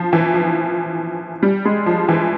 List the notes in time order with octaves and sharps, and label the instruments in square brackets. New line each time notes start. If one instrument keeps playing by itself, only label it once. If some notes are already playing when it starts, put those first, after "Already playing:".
Already playing: [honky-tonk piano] F3
E3
F3
G3
G#3
F3
E3